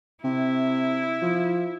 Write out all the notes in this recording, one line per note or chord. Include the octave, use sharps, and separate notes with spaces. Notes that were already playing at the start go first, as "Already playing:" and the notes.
C3 E4
F3